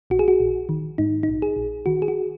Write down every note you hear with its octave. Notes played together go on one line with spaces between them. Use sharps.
A#1 F#4
G#4
F#4
A#1
D#3
G#2 D#4
A#1 D#4
G#4
A#1
D#3 F#4
G#4
F#4